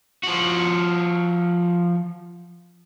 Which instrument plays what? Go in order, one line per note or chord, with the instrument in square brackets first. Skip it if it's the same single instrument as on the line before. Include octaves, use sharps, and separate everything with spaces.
[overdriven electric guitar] F3 F#4